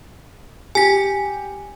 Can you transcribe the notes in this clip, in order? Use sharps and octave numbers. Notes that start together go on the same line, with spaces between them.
G4 G#5 B6